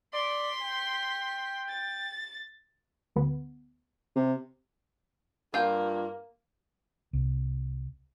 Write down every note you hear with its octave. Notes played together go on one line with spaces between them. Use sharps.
D5 C6 B6
G5
A6
D2 B3
C3
G2 A#3 F4 G5
C2